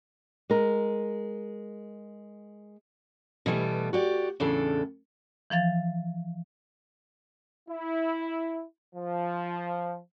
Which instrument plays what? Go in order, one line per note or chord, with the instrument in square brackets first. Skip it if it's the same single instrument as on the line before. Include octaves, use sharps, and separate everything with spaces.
[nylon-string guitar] G#3 A#4
[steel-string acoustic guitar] B2 E3 G3 A3 B3
F#4 G4 D5
E2 A2 C#3 D4 A4
[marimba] E3 F3 F5 A6
[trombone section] E4
F3